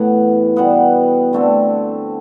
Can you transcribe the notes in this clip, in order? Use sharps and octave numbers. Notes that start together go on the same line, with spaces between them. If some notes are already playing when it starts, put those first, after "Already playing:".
Already playing: A2 E3 A3 B3 F#5
B2 G3 B3 F#5
D3 A3 C4